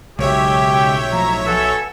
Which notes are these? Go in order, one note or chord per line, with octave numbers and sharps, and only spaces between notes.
B1 C#3 G#3 G4 A#4 C#5 E5
G5
A2 F3 A#5
A4 B4 F#5 G#5 E6